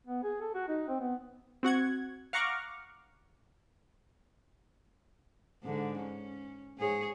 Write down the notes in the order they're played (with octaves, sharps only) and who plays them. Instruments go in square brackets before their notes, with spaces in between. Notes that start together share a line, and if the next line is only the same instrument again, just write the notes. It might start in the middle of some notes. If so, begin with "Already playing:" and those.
[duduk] B3
G#4
A4
F#4
D#4
C4
B3
[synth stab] C4 F#4 F#5 G#6
F5 F#5 A#5 C#6 D6 F6
[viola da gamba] G#2 D3
C#4
G#2 G#4 C#5